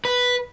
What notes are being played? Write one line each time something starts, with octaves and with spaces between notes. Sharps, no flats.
B4